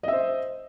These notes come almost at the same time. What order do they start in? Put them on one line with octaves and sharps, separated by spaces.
D#5 E5 C5